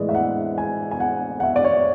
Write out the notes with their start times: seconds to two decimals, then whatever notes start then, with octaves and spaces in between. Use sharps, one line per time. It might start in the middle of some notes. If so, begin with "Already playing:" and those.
Already playing: A2 E3 G#3 D5
0.09 E5
0.15 F#5
0.58 G#5
0.91 G#5
1.00 F#5
1.40 F#5
1.43 E5
1.56 D5
1.64 C#5